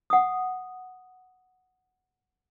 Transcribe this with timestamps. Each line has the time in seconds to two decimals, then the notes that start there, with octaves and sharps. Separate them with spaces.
0.10 F#5 D#6